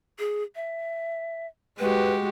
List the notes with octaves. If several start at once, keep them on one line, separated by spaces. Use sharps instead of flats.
G#4
E5
G#3 F#4 G4 B4